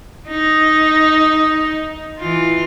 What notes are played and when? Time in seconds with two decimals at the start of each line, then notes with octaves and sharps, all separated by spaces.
0.29 D#4
2.19 E3 F4